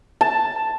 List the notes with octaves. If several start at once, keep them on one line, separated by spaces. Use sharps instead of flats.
A5